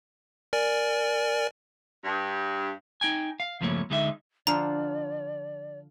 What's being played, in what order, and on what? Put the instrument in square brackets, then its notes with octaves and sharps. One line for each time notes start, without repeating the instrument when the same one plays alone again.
[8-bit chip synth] A#4 D5 G#5
[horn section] G2
[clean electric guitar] D#4 G5 G#5
F5
C#2 G2 F3 A3 A#3 C#5
D2 D3 G#3 D#4 F#4 E5
[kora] D3 F3 F4 [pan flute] D5 [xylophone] A#5